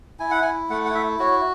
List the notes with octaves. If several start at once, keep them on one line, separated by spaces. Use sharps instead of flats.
E4 G#5
F#5
E4 G#5
A3 F#5
F#5
E4 E5
F#4 C#5